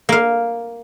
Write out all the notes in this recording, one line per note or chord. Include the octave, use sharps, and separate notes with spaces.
A#3 F5